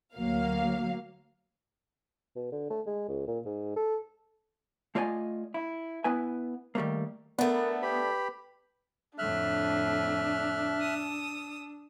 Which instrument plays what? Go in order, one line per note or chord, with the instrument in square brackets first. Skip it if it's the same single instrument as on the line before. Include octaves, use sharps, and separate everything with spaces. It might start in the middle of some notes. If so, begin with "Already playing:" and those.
[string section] D2 F#3 A#3 F5
[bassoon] B2
D3
A3
G#3
C#2
A#2
G#2
A4
[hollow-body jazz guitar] A3 F4 D5 D#5 G5 G#5
E4
B3 E4 B4 G#5
D#3 G3 A3 A#3
[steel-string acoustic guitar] A3 D4 [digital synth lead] B3 [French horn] A#4
[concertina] G4 B5 [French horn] B4
[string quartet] F2 A2 D3 [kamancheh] D4 [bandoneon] E5 F6 F#6
[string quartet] D#6 E6